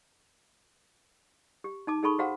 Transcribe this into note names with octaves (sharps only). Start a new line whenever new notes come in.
G4
D#4 A5 D6
D#4 G#4 A4 A5 B5 C#6
F#4 G4 C5 F5 F#5 A#5